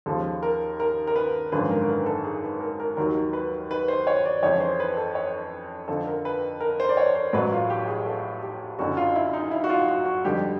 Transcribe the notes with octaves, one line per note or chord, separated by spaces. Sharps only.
D#2 C#3 F3 A4
A#4
A#4
A#4
B4
G#1 F#2 D3 F3 B4
A#4
A#4
B4
A4
G#4
B4
A#4
A#4
D#2 D#3 F#3 A#4
B4
B4
C5
C#5
D5
F2 C#3 E3 C#5
C5
B4
A4
C#5
F2 D3 F3 A4
A#4
B4
A#4
C5
D5
C#5
C5
A1 A2 F#3 B4
F4
G4
G#4
A4
G4
F#1 F#2 D3 F#4
F4
E4
D#4
E4
F#4
F4
F#4
F#4
F2 D3 G3 G4